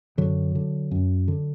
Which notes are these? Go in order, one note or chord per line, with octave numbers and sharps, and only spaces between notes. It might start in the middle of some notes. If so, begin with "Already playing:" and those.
F#2 D3 F#3
D3
F#2
D3